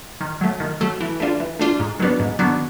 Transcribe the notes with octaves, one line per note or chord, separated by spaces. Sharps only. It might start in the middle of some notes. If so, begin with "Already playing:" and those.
D#3
F#3 A3
D#3
F#3 A3
E3
A3 D4 F4
E3
A3 D4 F4
G#2
D#3 F#3 B3 D4
G#2
D#3 F#3 B3 D4